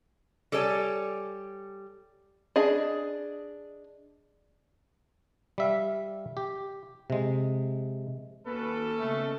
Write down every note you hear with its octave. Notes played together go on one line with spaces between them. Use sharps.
G3 A4 C#5 D5 G#5 A5
D4 G#4 D#5
G3 E5 F5
G4
C3 G#3
D#2 A#3 C#4 F#4 A4 B4 D6
C#3 A3 B3 D#5